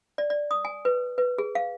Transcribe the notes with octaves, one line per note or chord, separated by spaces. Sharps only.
D5
D5
D#6
G#5
B4
B4
G#4
F5